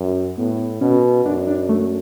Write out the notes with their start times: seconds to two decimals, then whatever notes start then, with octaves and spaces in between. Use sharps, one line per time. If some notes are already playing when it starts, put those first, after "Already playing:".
Already playing: F#2
0.38 A2 B3
0.81 B2 C#4
1.25 F#2 D4
1.47 D4
1.69 A3